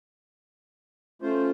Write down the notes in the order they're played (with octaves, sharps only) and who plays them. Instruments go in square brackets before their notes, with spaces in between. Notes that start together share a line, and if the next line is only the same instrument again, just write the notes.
[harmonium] A3 F4 C5 [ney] C#4